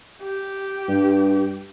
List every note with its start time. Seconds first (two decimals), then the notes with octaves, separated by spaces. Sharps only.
0.23 G4
0.88 G2